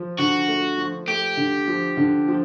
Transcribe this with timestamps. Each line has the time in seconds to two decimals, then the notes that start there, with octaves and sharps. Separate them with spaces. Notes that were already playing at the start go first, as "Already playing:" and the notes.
Already playing: F3
0.18 D3 F#4
0.48 A3
0.78 F3
1.07 A3 G4
1.37 D3
1.68 F3
1.97 D3
2.28 F3